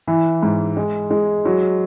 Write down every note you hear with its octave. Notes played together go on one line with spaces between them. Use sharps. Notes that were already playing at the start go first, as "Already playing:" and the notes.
E3
G#2
G#3
G#3
F#3